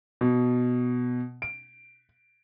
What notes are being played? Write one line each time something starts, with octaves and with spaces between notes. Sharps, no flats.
B2
D7